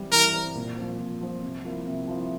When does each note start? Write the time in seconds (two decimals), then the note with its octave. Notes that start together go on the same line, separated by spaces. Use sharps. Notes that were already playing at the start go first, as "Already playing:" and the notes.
Already playing: E3 G3 C4 E4
0.12 E3 A#4
0.33 G3 C4 E4
0.55 A#2
0.77 F3 C4
0.99 A#2
1.21 F3 C4
1.43 C3
1.65 F3 A#3 E4
1.87 C3
2.08 F3 A#3 E4